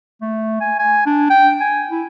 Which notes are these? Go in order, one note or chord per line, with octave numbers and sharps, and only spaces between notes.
A3
G#5
G#5
D4
G5
G#5
E4